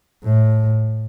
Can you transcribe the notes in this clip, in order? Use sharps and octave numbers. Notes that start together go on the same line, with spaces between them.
A2